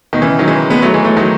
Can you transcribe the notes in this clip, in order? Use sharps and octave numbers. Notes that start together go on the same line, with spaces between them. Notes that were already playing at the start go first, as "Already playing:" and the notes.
B2 D#3
C#3 E3
D#3 F#3
E3 G#3
G#3 B3
F#3 A3
E3 G#3
F#3 A3
D#3 F#3